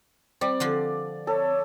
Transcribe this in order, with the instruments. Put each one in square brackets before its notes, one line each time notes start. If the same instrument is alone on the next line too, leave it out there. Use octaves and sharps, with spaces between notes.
[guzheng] G3 [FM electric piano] C4 [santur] D5
[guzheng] D3 F3 F4
[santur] A4 [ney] C#5